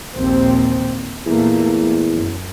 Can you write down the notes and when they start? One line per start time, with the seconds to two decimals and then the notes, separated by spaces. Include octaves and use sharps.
0.16 A#1 D#2 C4
1.26 E2 A#2 A3 A#3
2.12 F#2